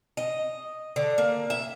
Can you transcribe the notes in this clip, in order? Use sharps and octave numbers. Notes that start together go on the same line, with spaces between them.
D#5
D3
A#3
E5